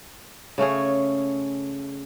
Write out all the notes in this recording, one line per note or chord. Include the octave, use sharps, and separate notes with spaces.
C#3 A3 C#4 G#4